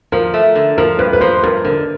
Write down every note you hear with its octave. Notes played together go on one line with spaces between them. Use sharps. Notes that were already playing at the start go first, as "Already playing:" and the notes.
F3 A#4
A3
D3
F3 A#4
G2 B4
B4
F3 C5
G2 A#4
D3 A#4